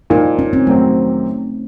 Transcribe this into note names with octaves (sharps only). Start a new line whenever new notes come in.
A#2 F3 A#3 D#4
C#4
C4
F2 C3 D#3 F#3 A3 C4